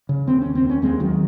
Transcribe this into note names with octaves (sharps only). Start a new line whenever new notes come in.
C#3
D#2 C4
D#2 C#4
C4
D#2
C#4
D#2 G#3 C4
D#2 D#3 F#3